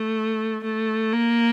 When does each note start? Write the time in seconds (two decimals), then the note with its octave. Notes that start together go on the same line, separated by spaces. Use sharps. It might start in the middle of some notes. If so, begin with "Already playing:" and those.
Already playing: A3
0.64 A3
1.13 A#3